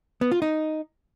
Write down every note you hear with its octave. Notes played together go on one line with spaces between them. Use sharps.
B3
F4
D#4